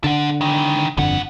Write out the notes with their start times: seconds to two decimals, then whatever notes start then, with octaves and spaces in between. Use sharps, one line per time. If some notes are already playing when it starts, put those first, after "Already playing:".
0.04 D3 A4 F#5
0.41 D#3 E3
0.97 G1 F2 A2 D3 F#5